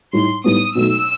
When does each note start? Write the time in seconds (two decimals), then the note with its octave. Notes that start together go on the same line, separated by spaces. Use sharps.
0.13 A2 G3 D#4 C6
0.44 A2 G3 B3 D#4 D#6
0.75 B2 F#3 A3 D#4 E6